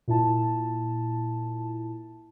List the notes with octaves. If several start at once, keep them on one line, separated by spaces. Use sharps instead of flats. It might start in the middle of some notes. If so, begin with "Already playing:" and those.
A#2 E4 A5